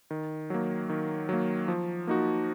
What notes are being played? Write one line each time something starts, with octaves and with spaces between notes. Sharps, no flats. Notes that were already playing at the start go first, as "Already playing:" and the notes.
D#3
F#3 A#3
D#3
F#3 A#3
F3
A#3 D#4 F#4